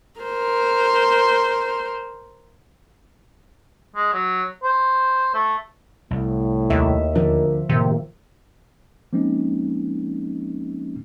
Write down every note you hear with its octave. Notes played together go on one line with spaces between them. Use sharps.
A#4 C5
G#3
F#3
C5
A3
C2 A2
D#2 E5
D2 D3 F3 D4 A#4
A2 C3 D#3 A#3
F3 G#3 A#3 C4 C#4 D#4